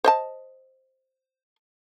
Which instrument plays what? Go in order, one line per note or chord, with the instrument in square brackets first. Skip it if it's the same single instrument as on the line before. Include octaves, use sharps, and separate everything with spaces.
[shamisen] C5 D#5 A5